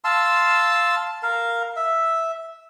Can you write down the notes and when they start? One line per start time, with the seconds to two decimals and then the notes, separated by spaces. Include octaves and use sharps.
0.04 F5 A5 C6 E6
1.23 A#4 F5
1.76 E5